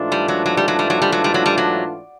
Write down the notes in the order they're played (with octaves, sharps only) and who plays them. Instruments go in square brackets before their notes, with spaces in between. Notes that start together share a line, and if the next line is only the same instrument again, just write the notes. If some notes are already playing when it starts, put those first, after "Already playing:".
Already playing: [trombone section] G#2 E3 A3 D4 F4
[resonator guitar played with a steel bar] G3
F#3
F#3
G3
F#3
G3
F#3
G3
F#3
G3
F#3
G3
F#3